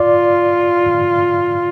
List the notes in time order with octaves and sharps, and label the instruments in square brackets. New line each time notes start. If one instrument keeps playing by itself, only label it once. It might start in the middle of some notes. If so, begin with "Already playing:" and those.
Already playing: [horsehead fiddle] F4 [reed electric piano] D5